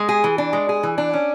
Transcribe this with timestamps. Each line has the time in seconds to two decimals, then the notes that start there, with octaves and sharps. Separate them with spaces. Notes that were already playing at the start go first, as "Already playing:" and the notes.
Already playing: G#3
0.09 G#4
0.24 E3
0.38 D4
0.53 G#3
0.69 G#4
0.83 E3
0.98 D4
1.13 C#4